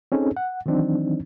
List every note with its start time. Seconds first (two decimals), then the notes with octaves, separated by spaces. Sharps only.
0.12 C4 C#4 D#4 G#4 A4
0.37 F#5
0.66 D#3 E3 F#3 C4 D4 D#4